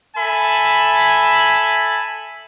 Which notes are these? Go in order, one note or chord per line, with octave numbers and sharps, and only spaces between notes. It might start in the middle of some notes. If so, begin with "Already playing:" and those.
A4 E5 G#5 B5